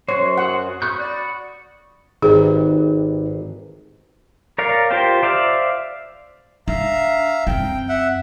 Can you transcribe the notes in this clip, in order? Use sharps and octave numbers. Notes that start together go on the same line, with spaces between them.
F#2 F#4 C5 C#5
C#5 F#5 D#6
B5 C#6 D#6 F#6 G6
F#4 D5
G#1 D#4 G4 G#4 B4
A#4 C#5 D5 F5
F4 G4 A#4 C5 G5
C5 D5 E5 F5
D4 E5 F5 A#5
F#2 C4 G5
E5 F#5